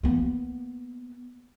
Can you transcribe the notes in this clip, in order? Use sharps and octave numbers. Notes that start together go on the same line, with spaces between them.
A#3 B3